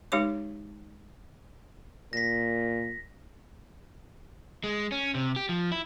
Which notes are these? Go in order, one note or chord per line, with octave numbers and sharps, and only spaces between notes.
G#3 D#4 G4 C#5 D6
A#2 A#6 B6
G#3
C#4
C3
G4
F3
E4